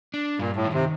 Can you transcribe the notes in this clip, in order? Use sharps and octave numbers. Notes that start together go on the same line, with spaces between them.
D4
G2 A#2
A2
D#3
C3